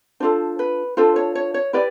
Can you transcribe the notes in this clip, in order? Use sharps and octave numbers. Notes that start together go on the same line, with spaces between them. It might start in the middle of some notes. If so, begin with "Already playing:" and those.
D4 F4 A4 C5
B4
D4 F4 A4 C5
C#5
C#5
C#5
E4 G4 B4 D5